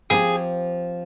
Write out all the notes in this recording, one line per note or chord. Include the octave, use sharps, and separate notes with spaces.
F3 C4 G4 G#4